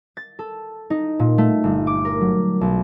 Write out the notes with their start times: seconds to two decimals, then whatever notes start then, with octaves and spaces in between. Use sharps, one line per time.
0.17 A6
0.39 A4
0.90 D#4
1.19 A#2
1.38 A3
1.64 G1
1.87 D6
2.05 A#4
2.21 F#3
2.61 B1